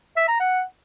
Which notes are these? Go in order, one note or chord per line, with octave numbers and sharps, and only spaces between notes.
E5
A#5
F#5